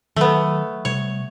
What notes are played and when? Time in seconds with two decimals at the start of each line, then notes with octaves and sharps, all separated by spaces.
0.16 D#3 F#3 A3 B3
0.85 C3 G3 C#5